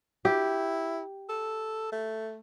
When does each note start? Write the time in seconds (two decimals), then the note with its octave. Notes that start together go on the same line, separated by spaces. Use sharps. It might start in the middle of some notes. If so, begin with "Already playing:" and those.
0.25 E4 G4
1.29 A4
1.92 A3